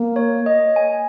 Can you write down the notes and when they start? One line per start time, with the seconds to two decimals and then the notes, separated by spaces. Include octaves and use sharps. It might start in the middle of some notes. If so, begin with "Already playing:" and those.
Already playing: A#3
0.16 C#5
0.46 D#5
0.76 G#5